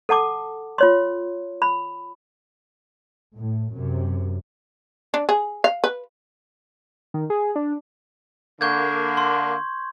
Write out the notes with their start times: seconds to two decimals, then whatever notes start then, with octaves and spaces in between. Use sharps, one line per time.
0.09 A4 F#5 A5 D6
0.78 F4 C#5 C6
1.62 B5
3.36 A2
3.74 F#2 C3
5.14 D4
5.29 G#4
5.64 F5
5.84 B4
7.14 D#3
7.30 G#4
7.56 D4
8.61 D3 A#3 C#6 G6 G#6
9.17 C6